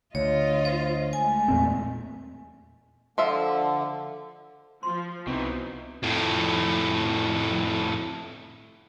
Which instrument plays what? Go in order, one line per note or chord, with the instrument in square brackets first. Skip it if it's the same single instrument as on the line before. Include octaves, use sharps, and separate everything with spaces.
[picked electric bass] D2 [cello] F4 D#5 [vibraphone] C#5
[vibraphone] C5
[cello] G#3 A3 [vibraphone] G#5
[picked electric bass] E2 A#2 C4
[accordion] D3 [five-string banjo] F3 F4 E5
[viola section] F3 [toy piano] C6
[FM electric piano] C2 C4 C5 [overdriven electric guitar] B2 E3 [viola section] D#4
[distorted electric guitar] F2 A2